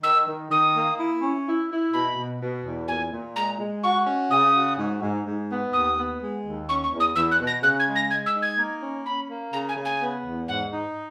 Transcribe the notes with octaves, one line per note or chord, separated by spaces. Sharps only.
D#3 E6
D#3
D#3 D#6
A#3
E4
C#4
E4
E4
B2 B5
B2
B2
E2
A#2 G#5
A#2
G#3 A#5
G#3
F#4 C#6
C#4
C#3 D#6
F#4
G#2
G#2
G#2
B3
D#2 D#6
B3
G#3
D#2
C#4 C#6
C#6
E2
D#6
E2 E6
F#6
B2
A#6
C#3 F#6
G#6
G#3
A#6
G#3 G#6
E6
D#4
G#6
A#3
C#4
C#4 B5
A#3
C#3 A#5
G#5
C#3
G#5
B3
E2
G#2 F#5
D#4